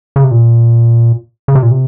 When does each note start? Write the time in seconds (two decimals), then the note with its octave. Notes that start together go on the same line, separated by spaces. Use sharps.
0.16 C#3
0.24 C3
0.31 A#2
1.48 C#3
1.55 C3
1.63 A#2
1.71 C3